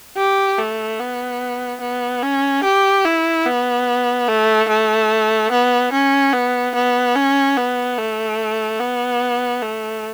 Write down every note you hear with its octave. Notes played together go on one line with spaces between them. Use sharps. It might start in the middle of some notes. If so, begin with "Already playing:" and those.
G4
A3
B3
B3
C#4
G4
E4
B3
A3
A3
B3
C#4
B3
B3
C#4
B3
A3
B3
A3